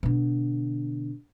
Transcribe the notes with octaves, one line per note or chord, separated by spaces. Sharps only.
B2 D3